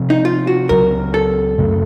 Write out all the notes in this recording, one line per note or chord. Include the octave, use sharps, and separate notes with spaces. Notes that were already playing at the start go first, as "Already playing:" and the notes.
Already playing: C3 F3 C4
D#4
F4
F#4
C#2 C#3 F#3 A#4
A4
F#2 C#3 A3